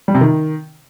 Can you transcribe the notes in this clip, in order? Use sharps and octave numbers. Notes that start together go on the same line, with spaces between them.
G3
C3
D#3